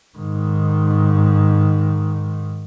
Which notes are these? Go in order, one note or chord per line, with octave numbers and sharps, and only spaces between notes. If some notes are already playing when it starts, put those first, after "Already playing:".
G#2 D#3